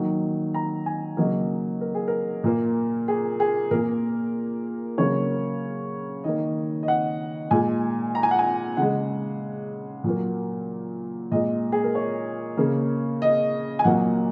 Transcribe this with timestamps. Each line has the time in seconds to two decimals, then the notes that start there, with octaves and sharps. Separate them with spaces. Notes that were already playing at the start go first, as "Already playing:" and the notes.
Already playing: D#3 F#3 A#3
0.54 A#5
0.86 G#5
1.17 C#3 F#3 A#3 D#5
1.81 A#4
1.95 G#4
2.08 A#4
2.44 A#2 A#3
3.08 G#4
3.40 G#4
3.71 A#2 A#3 A#4
4.98 C#3 F#3 A#3 C#5
6.24 D#3 A#3 D#5
6.83 D#5
6.88 F#5
7.51 A#2 G#3 G#5
8.15 A#5
8.23 G#5
8.31 F#5
8.39 G#5
8.77 C#3 G#3 F#5
10.04 A#2 F#3 A#3
11.31 A#2 G#3 D#5
11.72 G#4
11.84 A#4
11.95 C#5
12.57 C#3 A#3
13.22 D#5
13.79 G#5
13.84 A#2 F#3 A#3 F#5